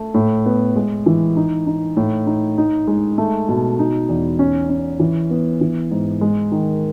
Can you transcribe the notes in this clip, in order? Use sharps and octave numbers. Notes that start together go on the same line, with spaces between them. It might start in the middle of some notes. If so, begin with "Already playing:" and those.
Already playing: A3
A2
B3
G#3
E3
D#4
D#4
A2
D#4
D#4
G#3
A3
B2
D#4
E2
C#4
C#4
E3
B3
E3
G#2
G#3
D#3